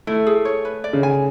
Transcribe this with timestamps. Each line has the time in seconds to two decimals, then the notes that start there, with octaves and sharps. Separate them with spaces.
0.07 A3 E4
0.27 G#4
0.45 C#5
0.65 B4
0.84 D5
0.93 C#3
1.03 G#5